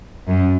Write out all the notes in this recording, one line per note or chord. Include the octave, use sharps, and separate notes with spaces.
F#2